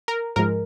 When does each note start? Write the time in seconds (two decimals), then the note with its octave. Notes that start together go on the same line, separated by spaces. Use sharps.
0.08 A#4
0.36 G#2 F3 G#3 A#4